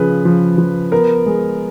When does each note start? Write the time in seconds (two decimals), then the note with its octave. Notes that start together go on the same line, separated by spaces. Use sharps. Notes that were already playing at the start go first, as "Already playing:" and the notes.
Already playing: C#3 F3 B4
0.25 F3
0.58 F3
0.92 B3 A#4
1.26 G#3